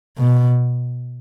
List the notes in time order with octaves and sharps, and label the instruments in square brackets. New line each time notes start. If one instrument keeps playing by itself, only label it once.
[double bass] B2